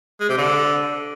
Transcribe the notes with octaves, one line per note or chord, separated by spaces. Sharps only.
G#3
C3
D3